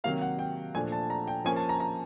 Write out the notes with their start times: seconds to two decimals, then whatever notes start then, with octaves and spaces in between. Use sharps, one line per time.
0.04 C3 D#3 F#3 A#3 F5
0.22 F#5
0.39 G5
0.75 A#2 F3 A3 D4 G#5
0.92 A5
1.10 A#5
1.27 G5
1.45 F3 A#3 C#4 G#5
1.56 A5
1.69 A#5
1.80 A#5